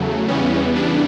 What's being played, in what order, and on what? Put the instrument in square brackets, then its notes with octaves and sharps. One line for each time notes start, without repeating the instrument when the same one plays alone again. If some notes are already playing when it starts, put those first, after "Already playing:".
Already playing: [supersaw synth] E2 C#3 F#3 A3
E2 C#3 E3 G3 B3 C#4
D4